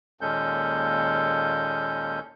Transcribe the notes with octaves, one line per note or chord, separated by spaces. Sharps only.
D#2 A#2 G#3 C#4 A4 G6